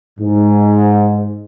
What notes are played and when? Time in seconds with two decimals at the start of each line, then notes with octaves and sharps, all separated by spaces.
0.19 G#2